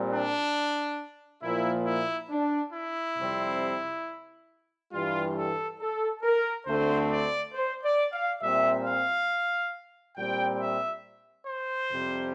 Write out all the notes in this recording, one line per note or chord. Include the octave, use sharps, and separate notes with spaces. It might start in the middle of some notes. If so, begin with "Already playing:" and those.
Already playing: A#2 G3 C4
D4
A#2 F3 A#3 E4
E4
D4
E4
F2 C3 G3 C4
G2 E3 G3 F4
A4
A4
A#4
D2 D3 A3 C4 C5
D5
C5
D5
F5
A#2 G3 C4 E5
F5
A#2 G3 C4 G5
E5
C5
F2 C3 G3